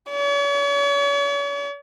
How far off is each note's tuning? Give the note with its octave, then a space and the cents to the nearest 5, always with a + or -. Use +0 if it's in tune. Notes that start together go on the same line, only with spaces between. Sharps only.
C#5 +40